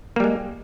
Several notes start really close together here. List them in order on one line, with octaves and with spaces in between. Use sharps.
A#3 G3 G#3